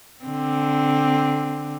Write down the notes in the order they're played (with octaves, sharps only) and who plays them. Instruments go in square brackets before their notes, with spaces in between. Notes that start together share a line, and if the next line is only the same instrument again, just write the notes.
[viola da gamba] D3 C4